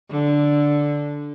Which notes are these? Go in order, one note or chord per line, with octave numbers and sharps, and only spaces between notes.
D3